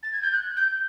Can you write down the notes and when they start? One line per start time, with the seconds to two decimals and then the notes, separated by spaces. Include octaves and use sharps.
0.03 A6
0.12 G#6
0.22 G6
0.32 F#6
0.56 G6